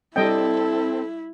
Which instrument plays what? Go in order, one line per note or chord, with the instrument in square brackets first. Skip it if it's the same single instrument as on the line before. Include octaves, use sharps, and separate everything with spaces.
[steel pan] G3 D#5 G5 [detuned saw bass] C4 [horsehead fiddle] E4 [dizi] A4